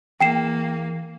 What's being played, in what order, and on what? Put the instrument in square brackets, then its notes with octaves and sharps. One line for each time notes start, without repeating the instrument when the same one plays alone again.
[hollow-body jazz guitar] E2 [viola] A#3 [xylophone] G5 C7 E7